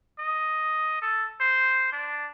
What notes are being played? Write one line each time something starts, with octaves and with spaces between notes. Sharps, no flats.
D#5
A4
C5
D4